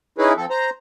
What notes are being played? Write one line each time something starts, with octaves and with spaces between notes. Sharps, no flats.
C#4 D#4 E4 G#4 B4
F3 C4 A4
C5 A#5